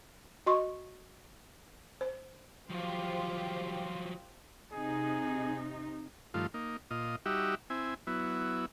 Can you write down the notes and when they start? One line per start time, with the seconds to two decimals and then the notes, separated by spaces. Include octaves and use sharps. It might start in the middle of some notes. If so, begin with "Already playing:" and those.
0.47 F#4 D#5 C6 C#6
2.01 C5
2.70 F3 F#3 F4 G4 C5
4.73 C3 D#4 G#4
6.34 G2 D#3 F3 A3 F4
6.54 A#3 D#4
6.91 A#2 F4 D#5
7.26 G3 D#4 F#4 G4 E5
7.70 C4 E4 G#5
8.07 F#3 B3 E4